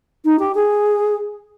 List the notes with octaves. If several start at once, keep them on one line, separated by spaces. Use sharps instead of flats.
D#4
G4
G#4